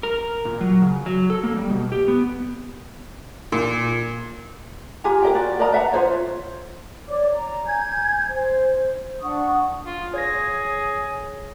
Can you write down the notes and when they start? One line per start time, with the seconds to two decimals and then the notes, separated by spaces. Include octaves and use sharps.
0.03 A#4
0.45 A#2
0.61 F#3
0.82 C#3
1.06 F#3
1.30 A4
1.44 A#3
1.56 G3
1.70 B2
1.92 G4
2.08 B3
3.52 A#2
5.04 F4 G4 G#5 A#5
5.22 A#4 D#5 G5
5.34 F4 F#4 D5
5.59 A#4 D5 D#5 A#5
5.72 B4 E5 F#5 A#5
5.92 F4 G#4 C5 C#5
7.09 C#5 D5 D6
7.32 A#5
7.67 G#5 G6 G#6
8.28 C5
9.22 D4 F#5 C#6 D#6
9.86 F4
10.14 G#4 C#5 G#6 A#6